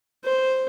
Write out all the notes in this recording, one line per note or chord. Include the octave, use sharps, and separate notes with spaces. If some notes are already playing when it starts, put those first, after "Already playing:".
C5